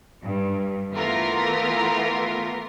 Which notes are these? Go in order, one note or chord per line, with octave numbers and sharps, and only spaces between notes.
G2
E3 A3 B3 F4 A#4